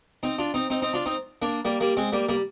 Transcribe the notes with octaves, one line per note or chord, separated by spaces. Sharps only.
C4 D#4
D4 F4
C4 D#4
C4 D#4
C4 D#4
D4 F4
C4 D#4
A#3 D4
G3 A#3
G3 A#3
G#3 C4
G3 A#3
G3 A#3